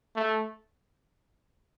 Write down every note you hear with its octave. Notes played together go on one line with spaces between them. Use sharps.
A3